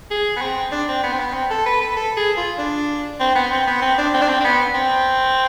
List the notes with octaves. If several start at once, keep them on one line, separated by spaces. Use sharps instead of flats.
G#4
B3
C4
D4
C4
B3
C4
B3
C4
A4
B4
B4
A4
G#4
F4
D4
C4
B3
C4
B3
C4
D4
C4
D4
C4
C4
B3
C4